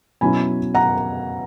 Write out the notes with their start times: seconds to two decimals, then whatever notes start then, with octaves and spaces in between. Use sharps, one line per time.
0.21 B2 F#3 C#4 E4 G#5 B5
0.74 F#5 A#5